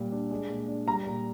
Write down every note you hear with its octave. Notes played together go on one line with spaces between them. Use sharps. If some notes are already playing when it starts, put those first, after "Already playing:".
Already playing: A#2 G3
D4
G#3
A#2
D4
G3 A#5
A#2